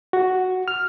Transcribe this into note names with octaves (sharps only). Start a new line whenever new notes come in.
F#4
F6